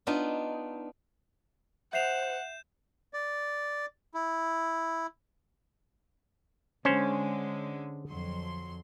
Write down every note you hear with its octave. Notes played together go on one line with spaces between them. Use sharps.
B3 D4 D#4 F4
C5 E5 F#5 G6 C7 E7 F7
D5
E4
D3 G#3 C#4 C5
F2 F#3 C6